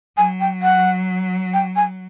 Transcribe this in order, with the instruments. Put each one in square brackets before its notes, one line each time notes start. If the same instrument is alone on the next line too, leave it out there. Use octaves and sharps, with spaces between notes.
[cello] F#3 [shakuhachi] G#5
[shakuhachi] G5
F#5
G5
G#5